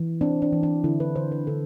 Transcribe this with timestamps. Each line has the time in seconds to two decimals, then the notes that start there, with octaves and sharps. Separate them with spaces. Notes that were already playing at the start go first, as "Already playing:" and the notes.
Already playing: E3
0.21 C4 D4
0.42 D4
0.53 E3
0.63 D4
0.84 D3 E4
1.00 B4
1.16 D3 C5
1.32 B4
1.47 D3 A4